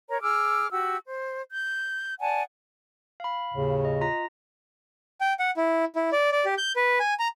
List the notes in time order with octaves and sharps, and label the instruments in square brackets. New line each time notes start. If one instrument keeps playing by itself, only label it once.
[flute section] A#4 C#5 A#5
G#4 D6 E6 F6
F#4 G4 E6
C5
G6
D5 F#5 G#5 A5
[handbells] F5 B5
[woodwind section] D#2 A2 C#3
[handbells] D#5
F4 A#5 A#6
[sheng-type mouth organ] G5
F#5
E4
E4
D5
D5
G4
G6
B4
G#5
A#5